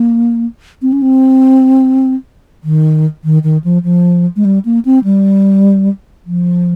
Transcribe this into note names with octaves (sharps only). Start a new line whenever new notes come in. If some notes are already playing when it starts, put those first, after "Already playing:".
Already playing: A#3
C4
C#4
C4
D#3
D#3
D#3
F3
F3
G#3
G3
A#3
C4
G3
F3